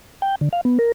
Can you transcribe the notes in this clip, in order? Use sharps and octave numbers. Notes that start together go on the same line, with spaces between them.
G5
D3
F5
B3
A#4